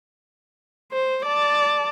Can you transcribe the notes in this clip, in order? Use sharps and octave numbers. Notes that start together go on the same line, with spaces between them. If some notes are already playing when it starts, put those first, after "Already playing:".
C5
D5 A5